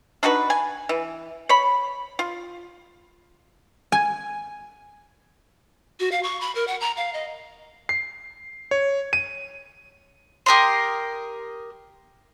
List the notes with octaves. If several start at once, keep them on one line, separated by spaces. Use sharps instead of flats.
D4 D#4 F#4 B4
G#5
E3
C#5 B5
F4
G#5
F#4
F5
C#6
B5
A#4
F#5
A#5
F5
D#5
C7
C#5
D#7
G4 A#4 D#5 C6